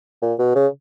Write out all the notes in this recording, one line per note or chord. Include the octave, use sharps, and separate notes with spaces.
A#2
B2
C#3